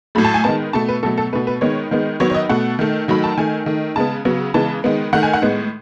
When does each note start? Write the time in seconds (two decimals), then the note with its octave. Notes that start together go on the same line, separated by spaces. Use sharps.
0.15 A2 F#3 A3 B5
0.25 A5
0.34 G#5
0.44 D#3 G#3 B3 A5
0.73 B2 A3 A5
0.89 B4
1.03 B2 F#3 A3 A4
1.18 A4
1.33 B2 A3 B4
1.47 B4
1.61 D#3 G#3 B3 C#5
1.91 D#3 G#3 B3
2.20 D#3 F#3 B3 C#5
2.30 C#5
2.35 D#5
2.49 B2 A3 F#5
2.79 D#3 A3
3.08 D#3 F#3 A3 B5
3.24 A5
3.37 D#3 A3 G#5
3.66 D#3 A3
3.96 C#3 G#3 B3 A5
4.25 C#3 F#3 B3
4.54 C#3 E3 G#3 B3 A5
4.84 D#3 G#3 B3
5.13 D#3 A3 F#5
5.23 G#5
5.33 F#5
5.42 A2 G#3 B3